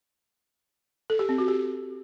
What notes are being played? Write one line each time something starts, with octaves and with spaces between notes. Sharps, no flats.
A4
G4
C4
F#4
G4